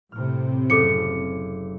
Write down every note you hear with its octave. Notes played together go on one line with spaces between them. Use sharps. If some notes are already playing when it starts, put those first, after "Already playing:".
A2 C3 F6
F#1 A4 D6 C#7